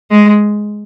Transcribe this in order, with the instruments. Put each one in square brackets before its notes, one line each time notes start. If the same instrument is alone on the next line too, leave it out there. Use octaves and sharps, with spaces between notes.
[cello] G#3